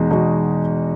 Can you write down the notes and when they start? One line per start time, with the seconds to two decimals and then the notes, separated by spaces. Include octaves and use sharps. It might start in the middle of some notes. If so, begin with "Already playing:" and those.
Already playing: E2 B2 G#3 D#4 F#4
0.11 E2 B2 G#3 D#4 F#4